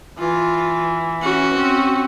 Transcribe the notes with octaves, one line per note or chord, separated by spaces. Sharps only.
E3 F4
C#4 F#4
C4